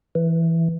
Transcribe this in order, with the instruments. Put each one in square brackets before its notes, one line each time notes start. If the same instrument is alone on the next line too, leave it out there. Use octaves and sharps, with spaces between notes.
[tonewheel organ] E3